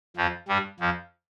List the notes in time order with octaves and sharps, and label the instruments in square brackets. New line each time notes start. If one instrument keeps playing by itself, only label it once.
[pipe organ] F2 F3
G2 G3
F2 F3